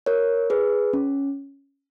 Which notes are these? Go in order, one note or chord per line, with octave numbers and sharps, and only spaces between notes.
A#4 C#5
G#4 B4
C#4